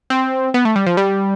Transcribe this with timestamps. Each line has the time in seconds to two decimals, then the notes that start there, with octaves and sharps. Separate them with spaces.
0.10 C4
0.54 B3
0.65 A3
0.76 G3
0.86 F3
0.97 G3